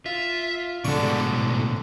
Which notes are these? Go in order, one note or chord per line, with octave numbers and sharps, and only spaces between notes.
F4 E5
G#2 B2 D3 D4 C#6
G3 G#3
B1 A2